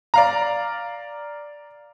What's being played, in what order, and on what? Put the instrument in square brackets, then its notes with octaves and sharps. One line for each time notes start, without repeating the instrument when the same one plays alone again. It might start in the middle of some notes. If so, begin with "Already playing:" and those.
[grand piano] D5 F5 A#5